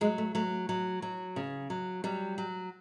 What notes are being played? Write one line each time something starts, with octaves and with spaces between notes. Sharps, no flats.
F#3 G#3
A3
F#3 A3
F#3
F#3
C#3
F#3
F#3 G3
F#3